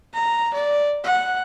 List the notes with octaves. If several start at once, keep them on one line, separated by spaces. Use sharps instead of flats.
A#5
D5
F#5